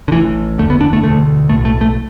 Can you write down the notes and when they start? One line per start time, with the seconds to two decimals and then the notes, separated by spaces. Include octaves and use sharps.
0.08 D3
0.12 A1 A2 E3
0.58 F#1 E2 D3 A3
0.70 B3
0.81 D4
0.93 A3
1.04 E1 D2 D3 A3
1.49 B1 A2 A3
1.65 A3
1.81 A3